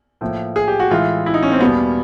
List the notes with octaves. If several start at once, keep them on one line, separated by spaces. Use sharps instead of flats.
A2 F3 A#3
G#4
G4
F#4
A2 E3 G#3 F4
E4
D#4
C#4
C4
E2 B2 G3 A#3 B3